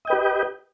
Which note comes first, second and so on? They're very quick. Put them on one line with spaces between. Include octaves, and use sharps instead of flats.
D#5 G5 B4 G4